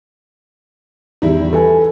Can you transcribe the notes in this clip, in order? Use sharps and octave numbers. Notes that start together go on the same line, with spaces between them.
E2 D#3 G3 E4
A4 B4 G#5